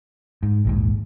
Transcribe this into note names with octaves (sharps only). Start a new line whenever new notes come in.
G#2
A#1 D#2 G#2